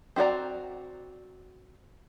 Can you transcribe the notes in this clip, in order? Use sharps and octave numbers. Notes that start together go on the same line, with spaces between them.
C4 E4 F#4 D5 A#5